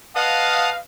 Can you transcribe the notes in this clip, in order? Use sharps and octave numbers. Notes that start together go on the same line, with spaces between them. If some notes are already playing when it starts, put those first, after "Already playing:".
B4 D#5 F5 F#5 A5 D#6